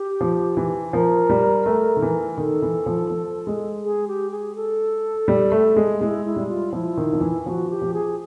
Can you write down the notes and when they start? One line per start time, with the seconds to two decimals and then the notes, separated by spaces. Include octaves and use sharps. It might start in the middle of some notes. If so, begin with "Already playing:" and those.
Already playing: G4
0.21 F3
0.57 E3
0.93 F3 A#4
1.29 G3
1.66 A3
1.96 D#3
2.02 E3
2.37 D#3 A4
2.62 E3
2.86 F3
3.10 F3
3.47 G#3
3.83 G#4
4.08 G4
4.31 G#4
4.55 A4
5.28 G3
5.52 A3
5.76 G#3
6.00 G#3 E4
6.25 E4
6.36 G3
6.48 F4
6.73 F3 E4
6.97 D#3
7.13 F3
7.21 E3
7.46 F3 F#4
7.70 G4
7.81 F3
7.94 G#4